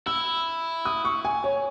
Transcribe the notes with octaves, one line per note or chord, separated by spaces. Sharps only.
E4 E6
D#6
C#6
G#5
C#5